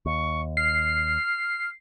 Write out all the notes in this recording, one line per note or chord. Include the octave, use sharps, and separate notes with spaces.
D#2 C#6
F6 C7